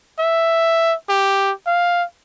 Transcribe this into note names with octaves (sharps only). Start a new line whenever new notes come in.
E5
G4
F5